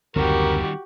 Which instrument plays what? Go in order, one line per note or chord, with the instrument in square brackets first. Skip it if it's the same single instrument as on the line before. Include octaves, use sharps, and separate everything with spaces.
[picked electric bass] F#1 D2 C4 [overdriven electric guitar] D#3 G3 [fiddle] F#4 G4 [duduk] A#4